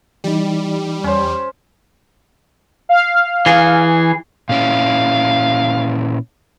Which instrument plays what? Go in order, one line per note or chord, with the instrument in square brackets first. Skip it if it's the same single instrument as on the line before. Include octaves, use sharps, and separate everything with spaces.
[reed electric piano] E3 D#4 [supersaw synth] G3
[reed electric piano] E2 [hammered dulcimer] C#4 C5
[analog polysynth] F5
[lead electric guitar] E3 G#4
[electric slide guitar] A#2 C#4 E4 [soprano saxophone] F5